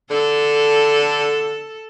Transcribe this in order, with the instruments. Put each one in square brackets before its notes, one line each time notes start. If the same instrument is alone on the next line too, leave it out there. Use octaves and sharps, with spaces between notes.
[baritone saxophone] D3 [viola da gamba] A4